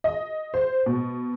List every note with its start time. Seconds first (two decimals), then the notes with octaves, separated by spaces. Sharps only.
0.04 D#5
0.54 C5
0.86 B2